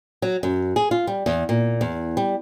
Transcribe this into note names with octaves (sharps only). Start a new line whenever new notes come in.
F#3
F#2
G#4
F4
G3
E2
A#2
E2
G3